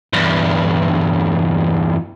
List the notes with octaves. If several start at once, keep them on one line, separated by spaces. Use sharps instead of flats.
E2 G2